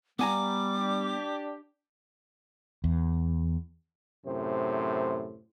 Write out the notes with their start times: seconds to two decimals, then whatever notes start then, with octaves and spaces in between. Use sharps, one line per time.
0.19 G3 B3 G#5 A#5 D6
0.77 D4 G4
2.84 E2
4.26 F#2 A2 C3 C5